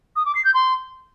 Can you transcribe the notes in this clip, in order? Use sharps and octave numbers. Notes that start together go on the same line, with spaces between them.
D#6
D6
C7
G6
C6